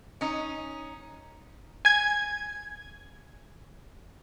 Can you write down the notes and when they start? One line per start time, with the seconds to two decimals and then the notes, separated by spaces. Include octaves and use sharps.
0.21 C#4 D#4
1.85 G#5 G#6